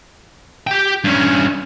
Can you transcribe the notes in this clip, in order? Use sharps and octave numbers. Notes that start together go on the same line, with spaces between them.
G4 G5
G2 C#4